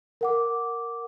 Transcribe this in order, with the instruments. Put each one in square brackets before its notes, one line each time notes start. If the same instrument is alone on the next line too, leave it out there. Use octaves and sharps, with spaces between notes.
[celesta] A#4 F#5 D6